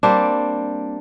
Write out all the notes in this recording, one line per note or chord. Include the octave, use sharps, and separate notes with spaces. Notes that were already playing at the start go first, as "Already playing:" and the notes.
G3 A#3 C4 D4